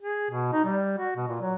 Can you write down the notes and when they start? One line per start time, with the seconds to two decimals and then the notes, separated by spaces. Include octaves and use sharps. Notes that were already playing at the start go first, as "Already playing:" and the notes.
0.02 G#4
0.31 B2
0.53 D#4
0.65 G3
0.98 F#4
1.16 B2
1.28 A#2
1.42 F#3